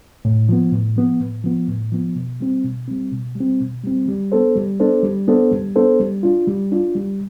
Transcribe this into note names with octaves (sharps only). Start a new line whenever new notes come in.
A2
F3 B3
A2
F3 B3
A2
F3 B3
A2
F3 B3
B2
G3 C4
B2
G3 C4
B2
G3
C4
B2
G3 C4
G3
B3 D4 A4 C5
G3
B3 D4 A4 C5
G3
B3 D4 A4 C5
G3
B3 D4 A4 C5
G3
D4 F4
G3
D4 F4
G3